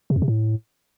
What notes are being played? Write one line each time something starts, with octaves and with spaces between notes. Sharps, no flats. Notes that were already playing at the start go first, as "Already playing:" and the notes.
C3
F2
C3
A2